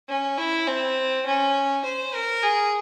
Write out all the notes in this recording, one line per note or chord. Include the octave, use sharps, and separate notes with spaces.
C#4
E4
C4
C#4
C5
A#4
G#4